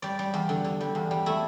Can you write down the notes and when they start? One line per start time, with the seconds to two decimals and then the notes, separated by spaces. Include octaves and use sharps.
0.02 G3 D5
0.19 G3
0.34 E2
0.49 D3
0.64 D3
0.81 G3
0.95 E2
1.11 G3
1.26 A3 E4